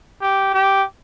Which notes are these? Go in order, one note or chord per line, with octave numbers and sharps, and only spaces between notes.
G4
G4